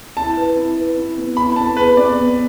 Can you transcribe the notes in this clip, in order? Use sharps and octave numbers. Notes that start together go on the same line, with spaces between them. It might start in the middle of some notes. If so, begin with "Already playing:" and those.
E4 A5
B4
E4
B4
E4
B3
E4 B5
B3 A5
G#4 B4
B3 D5
B3